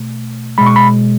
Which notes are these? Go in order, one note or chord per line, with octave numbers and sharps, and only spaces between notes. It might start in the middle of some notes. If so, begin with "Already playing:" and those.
Already playing: B2 A3
B2 G#3 B5
C#6
B5